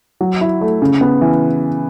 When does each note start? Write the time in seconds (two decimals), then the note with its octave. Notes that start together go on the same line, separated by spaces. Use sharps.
0.21 F#3
0.41 E4
0.61 A3
0.82 C#3
1.01 B3
1.21 E3